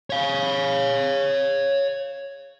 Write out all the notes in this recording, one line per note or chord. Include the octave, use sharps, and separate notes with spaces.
C#5 F5